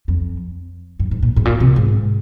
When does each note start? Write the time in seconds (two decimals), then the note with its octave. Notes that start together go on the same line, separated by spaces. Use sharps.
0.08 F2
0.99 G2
1.11 G#2
1.23 A#2
1.36 G#2
1.45 A#2
1.60 C3
1.76 G#2